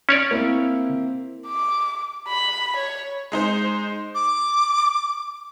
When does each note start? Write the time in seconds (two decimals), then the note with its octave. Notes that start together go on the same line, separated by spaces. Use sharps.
0.09 C#4 C#5 D5
0.31 A#3 C4 E4
1.47 D6
2.28 B5
2.77 C#5
3.32 G#3 D#4 C5
4.15 D6